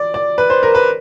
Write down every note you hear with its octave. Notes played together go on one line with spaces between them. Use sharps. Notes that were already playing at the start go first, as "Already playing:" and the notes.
Already playing: D5
D5
B4
C5
A#4
B4